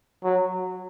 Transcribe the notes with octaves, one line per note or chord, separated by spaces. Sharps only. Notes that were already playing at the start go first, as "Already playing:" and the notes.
F#3